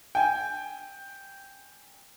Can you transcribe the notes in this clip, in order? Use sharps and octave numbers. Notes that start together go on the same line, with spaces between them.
G5 G#5